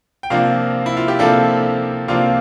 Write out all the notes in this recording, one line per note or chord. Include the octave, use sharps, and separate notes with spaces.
G5
C3 F3 A#3 D4 F5
E4
F4
G4
C3 F3 A#3 D4 A4
C3 F3 A#3 D4 F4